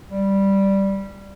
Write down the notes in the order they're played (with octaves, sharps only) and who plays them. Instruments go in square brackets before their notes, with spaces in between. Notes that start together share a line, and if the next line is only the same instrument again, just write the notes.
[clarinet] G3